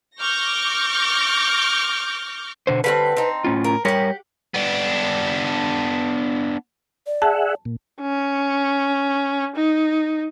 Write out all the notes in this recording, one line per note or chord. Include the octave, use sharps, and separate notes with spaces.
C#6 D6 F6 G6 A#6
B2 D3 C5
D3 G3 C4 B4
C4 D#4
A2 C#4 F4
A#4
G3 G4 A#4 C#5 F#5
B3 D4
D5
G#4 E5 F#5 A5
A#2
C#4
D#4